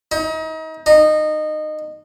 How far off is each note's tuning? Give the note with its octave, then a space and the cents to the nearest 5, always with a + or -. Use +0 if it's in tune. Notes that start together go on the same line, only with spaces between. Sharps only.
D#4 +35
D#4 -20